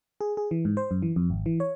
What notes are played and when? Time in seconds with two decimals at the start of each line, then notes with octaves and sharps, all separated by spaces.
0.21 G#4
0.37 G#4
0.51 E3
0.65 G#2
0.77 C5
0.91 F#2
1.02 E3
1.16 F2
1.30 G#1
1.46 E3
1.60 C#5